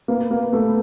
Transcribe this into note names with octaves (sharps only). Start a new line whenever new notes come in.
A#3 B3
A#3
A3 B3